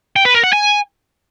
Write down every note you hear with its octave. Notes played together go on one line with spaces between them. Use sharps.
G5
B4
A#4
F#5
G#5